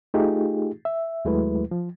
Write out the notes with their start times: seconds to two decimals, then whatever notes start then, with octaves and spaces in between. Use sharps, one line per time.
0.14 A3 D#4 F4 G4 G#4
0.85 E5
1.25 D#2 F#3 G#3 A3 E4 B4
1.71 F3